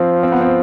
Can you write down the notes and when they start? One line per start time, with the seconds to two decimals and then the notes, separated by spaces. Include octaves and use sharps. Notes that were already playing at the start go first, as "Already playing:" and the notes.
Already playing: F3 C4
0.23 C4
0.32 B3
0.41 C4